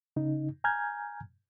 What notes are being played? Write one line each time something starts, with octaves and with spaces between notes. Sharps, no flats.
C#3 D#4
G#5 A#5 F6 G6 G#6